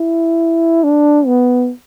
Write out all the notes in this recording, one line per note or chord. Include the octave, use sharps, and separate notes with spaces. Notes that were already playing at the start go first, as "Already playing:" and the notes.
Already playing: E4
D4
B3